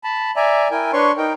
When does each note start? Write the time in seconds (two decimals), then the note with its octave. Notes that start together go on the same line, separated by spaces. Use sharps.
0.04 A5 B5
0.36 D5 E5 G#5 A#5
0.71 E4 A#4 G5 G#5
0.93 D4 B4 C#5 C6 C#6
1.17 D#4 A#4 G5